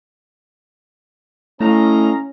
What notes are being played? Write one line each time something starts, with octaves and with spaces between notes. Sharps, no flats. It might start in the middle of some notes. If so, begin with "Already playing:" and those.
A2 A3 C#4 D#5 F5 A#5